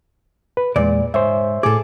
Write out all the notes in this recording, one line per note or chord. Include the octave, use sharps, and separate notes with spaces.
B4
E2 A#2 G#3 D5
G#2 C5 C#5 E5
A2 G#4 A4 D6